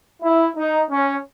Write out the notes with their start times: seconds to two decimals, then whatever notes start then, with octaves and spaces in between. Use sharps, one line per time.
0.21 E4
0.55 D#4
0.90 C#4